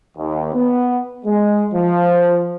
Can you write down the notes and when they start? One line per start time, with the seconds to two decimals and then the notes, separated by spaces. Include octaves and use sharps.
0.16 D#2
0.53 B3
1.24 G#3
1.72 F3